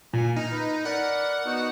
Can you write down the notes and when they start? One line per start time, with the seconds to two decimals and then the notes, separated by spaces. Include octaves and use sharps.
0.13 A#2 G#5
0.36 D#4 F6
0.52 B4
0.85 A#4 D5 F#5 B5
1.46 B3 D#4 F#4